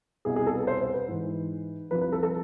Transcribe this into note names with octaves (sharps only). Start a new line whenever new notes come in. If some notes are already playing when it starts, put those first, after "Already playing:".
C2 B2 G#4
G#4
A4
B4
C5
C5
B4
G#2 E3
C2 C3 F3 B4
B4
A4
A4